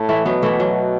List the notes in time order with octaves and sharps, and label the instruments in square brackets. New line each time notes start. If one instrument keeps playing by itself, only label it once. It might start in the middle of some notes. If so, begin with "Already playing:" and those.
Already playing: [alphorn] A2
[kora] E3 A3
[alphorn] B2 [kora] F#3 B3
[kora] E3 A3
F#3